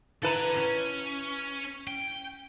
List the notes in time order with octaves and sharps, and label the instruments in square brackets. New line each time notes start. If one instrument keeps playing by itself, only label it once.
[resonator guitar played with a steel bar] E4 B4 A#5 [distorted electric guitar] A4 F#5
[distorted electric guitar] C#4
G5